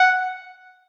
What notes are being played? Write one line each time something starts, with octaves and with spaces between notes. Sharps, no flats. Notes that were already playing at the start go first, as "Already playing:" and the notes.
Already playing: F#5